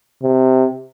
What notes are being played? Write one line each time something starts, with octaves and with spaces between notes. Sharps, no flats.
C3